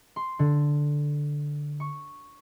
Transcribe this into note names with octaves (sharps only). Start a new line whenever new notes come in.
C6
D3
C#6